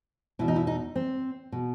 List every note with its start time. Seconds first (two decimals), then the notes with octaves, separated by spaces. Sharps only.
0.39 E2 B2 E4
0.48 D#4
0.56 E4
0.67 D#4
0.96 C4
1.52 B2